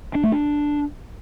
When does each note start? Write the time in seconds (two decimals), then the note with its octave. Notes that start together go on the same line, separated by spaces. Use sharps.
0.15 D4
0.23 A3
0.32 D4